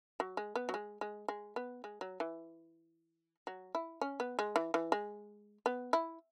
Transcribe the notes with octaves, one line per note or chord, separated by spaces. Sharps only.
F#3
G#3
B3
F#3
G#3
G#3
G#3
B3
G#3
F#3
E3
F#3
E4
C#4
B3
G#3
E3
E3
G#3
B3
E4